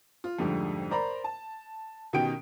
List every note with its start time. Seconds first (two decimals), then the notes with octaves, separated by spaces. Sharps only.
0.24 F4
0.39 F2 G#2 D3 G3 A3
0.91 A#4 C5 D5 A#5 B5
1.24 A5
2.13 B2 D#3 C#4 G4 G5 D7